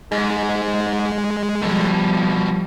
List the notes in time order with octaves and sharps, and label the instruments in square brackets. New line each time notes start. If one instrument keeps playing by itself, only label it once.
[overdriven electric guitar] G#2 [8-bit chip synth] G#3
[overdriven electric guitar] B2 A4 [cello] F3 G3